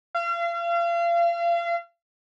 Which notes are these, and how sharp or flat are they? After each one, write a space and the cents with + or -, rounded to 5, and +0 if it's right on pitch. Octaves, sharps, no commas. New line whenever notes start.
F5 -35